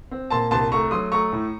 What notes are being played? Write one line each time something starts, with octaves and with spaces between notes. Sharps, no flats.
C4
A#2 A5 C6
C2 A5 C6
A3 A#5 C#6
F#3 C6 D#6
A3 A#5 C#6
A2